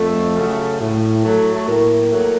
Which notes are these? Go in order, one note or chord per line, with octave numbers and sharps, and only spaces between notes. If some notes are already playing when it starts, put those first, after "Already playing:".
Already playing: F2 A3
C#3 F#3 A3
A2
F#3 A3
A3
A2 A#3
F#3 A3